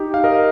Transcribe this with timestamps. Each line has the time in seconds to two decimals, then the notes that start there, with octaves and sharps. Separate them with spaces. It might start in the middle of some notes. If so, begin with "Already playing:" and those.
Already playing: D#4 G4
0.14 F5
0.24 A#4 D#5